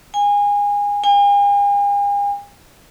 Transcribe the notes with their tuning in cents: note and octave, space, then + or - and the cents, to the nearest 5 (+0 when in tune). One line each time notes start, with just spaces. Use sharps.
G#5 -25
G#5 -45